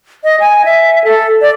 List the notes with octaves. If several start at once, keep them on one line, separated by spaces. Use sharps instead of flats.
D#5
G#5
E5
A4
D5